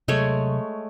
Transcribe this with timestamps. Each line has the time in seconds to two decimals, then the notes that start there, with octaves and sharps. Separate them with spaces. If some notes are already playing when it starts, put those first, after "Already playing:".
0.08 C3 F#3 G#3 A3 C#5